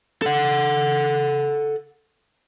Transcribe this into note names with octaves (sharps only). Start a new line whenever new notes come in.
A4 F#5